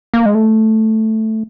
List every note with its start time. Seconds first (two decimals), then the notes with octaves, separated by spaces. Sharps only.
0.14 A#3
0.26 G#3
0.35 A3